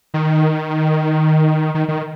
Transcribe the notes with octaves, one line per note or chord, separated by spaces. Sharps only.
D#3
D#3
D#3